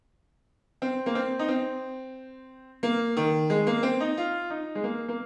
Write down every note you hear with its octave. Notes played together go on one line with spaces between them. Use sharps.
C4
A#3
C4
D#4
C4
A#3
D#3
G#3
A#3
C4
D#4
F4
D#4
G#3
A#3
A#3